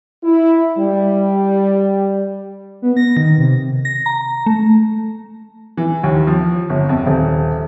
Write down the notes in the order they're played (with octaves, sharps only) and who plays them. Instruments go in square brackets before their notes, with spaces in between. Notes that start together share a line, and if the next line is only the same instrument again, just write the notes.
[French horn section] E4
G3
[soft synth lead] B3
A#6
D#3
C3
[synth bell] A#6
A#5
A3
[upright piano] E3
D#2
F3
G1
F2
D#1